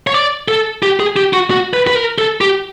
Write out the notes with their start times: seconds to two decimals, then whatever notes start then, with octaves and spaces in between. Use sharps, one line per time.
0.07 C#5
0.14 D5
0.48 A4
0.83 G4
1.00 G#4
1.16 G4
1.33 F#4
1.50 F#4
1.73 B4
1.87 B4
1.96 A#4
2.18 A4
2.41 G4